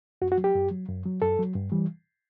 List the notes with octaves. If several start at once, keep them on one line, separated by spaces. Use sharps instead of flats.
F#2 F#4
F#4
F#3
G4
F#2
F#3
F#2
F#3
F#2 A4
F#3
G2
E3 G3